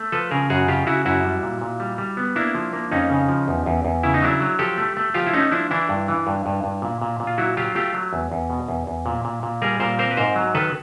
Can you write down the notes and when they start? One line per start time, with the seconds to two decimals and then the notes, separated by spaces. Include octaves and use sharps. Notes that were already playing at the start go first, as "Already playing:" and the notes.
Already playing: A3
0.12 F3 A4 B4
0.31 C#3 G#4 A#4
0.50 F#2 F#4 G#4
0.68 C#3 F4 G4
0.87 C#3 E4 F#4
1.05 F#2 E4 F#4
1.25 G3
1.43 A#2
1.61 A#2
1.80 G3
1.98 G3
2.17 B3
2.36 A#3 D4 E4
2.55 F3
2.73 A#3
2.91 F2 C#4 D#4
3.10 C#3
3.28 F3
3.48 E2
3.66 E2
3.85 E2
4.03 C#3 E4
4.14 D#4
4.22 F#3 D4 E4
4.40 F#3
4.59 F3 G4 A4
4.78 A3
4.97 A3
5.14 F3 F4 G4
5.27 E4
5.33 A3 C#4 D#4
5.52 F3 D4 E4
5.71 E3 D4 E4
5.89 G2
6.08 E3
6.27 G2
6.46 G2
6.64 G2
6.82 A#2
7.02 A#2
7.20 A#2
7.27 F4
7.38 F#3 E4 F#4
7.57 F#3 F4 G4
7.75 A3 F4 G4
7.94 F#3
8.13 E2
8.32 E2
8.50 B2
8.68 E2
8.87 E2
9.06 A#2
9.25 A#2
9.43 A#2
9.62 G3 G#4 A#4
9.80 A#2 A#4 C5
9.99 C4 A#4 C5
10.11 B4
10.17 G#2 A#4 C5
10.36 F#3
10.55 D#3 A4 B4